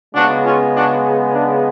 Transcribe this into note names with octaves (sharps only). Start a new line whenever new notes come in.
C#3 G#3 B3 D4 F#4
C#4 F4
D4 F#4
D4